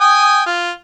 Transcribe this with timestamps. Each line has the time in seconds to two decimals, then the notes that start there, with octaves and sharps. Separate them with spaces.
0.01 G5 G#5 D#6
0.46 F4